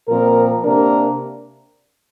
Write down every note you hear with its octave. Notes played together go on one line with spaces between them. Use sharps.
A#2 F3 C4 A#4
C3 A#3 D4 A#4